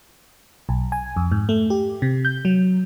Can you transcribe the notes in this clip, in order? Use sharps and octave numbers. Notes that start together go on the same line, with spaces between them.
B1
G#5
F2
G#2
A3
G4
C3
G6
F#3